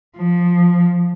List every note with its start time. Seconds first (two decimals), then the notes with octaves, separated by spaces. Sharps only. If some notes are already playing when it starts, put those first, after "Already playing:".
0.17 F3